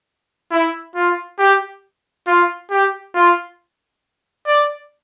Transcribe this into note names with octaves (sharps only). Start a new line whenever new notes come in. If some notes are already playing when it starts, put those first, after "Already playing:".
E4
F4
G4
F4
G4
F4
D5